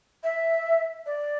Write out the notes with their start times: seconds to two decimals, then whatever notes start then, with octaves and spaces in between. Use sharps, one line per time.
0.24 E5
1.06 D5